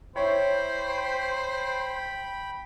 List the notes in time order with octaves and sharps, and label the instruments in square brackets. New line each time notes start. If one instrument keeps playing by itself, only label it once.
[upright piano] E4 C#5 [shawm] C5 [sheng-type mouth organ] G5 B5